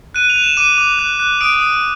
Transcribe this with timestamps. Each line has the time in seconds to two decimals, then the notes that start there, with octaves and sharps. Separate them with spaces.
0.14 F#6 D#7
0.30 F7
0.36 F#6
0.44 E7
0.57 D6 D#7
0.78 D6
0.99 F#6
1.19 F#6
1.41 D#6 D7
1.61 D#6